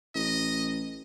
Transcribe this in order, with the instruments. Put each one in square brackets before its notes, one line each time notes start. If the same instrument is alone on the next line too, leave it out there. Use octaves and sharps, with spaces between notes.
[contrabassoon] A1 [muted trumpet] D#5